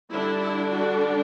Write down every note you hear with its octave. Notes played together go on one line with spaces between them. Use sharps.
D3 G3 D4 E4
E4
F#4 A4